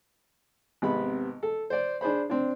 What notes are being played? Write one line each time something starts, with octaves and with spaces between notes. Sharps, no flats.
G#1 C3 B3 B5
A4
C5 D5
D4 G#4 C5 B5
C4 D4